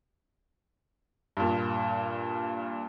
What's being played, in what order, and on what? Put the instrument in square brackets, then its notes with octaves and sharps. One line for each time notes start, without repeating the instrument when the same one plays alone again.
[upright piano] G2 A#2